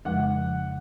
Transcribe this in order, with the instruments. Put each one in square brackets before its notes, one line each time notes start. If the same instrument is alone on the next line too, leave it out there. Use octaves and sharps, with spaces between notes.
[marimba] F2 C#3 F3 G#3 [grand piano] F#5